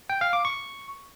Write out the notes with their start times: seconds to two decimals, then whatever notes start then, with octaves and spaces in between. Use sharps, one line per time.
0.10 G5
0.21 F5
0.33 D6
0.45 C#6